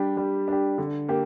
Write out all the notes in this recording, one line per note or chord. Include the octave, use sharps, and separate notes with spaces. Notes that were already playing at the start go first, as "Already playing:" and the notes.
Already playing: G3 D4 G4
G3
D4 G4
D3
A#3 G4